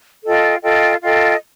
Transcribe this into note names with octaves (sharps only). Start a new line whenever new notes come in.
F4 A4 D#5 G5
F4 A4 D#5 G5
F4 A4 D#5 G5